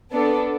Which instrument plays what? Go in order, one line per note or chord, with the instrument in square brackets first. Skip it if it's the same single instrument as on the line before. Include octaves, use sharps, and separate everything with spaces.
[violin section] B3 D4 A4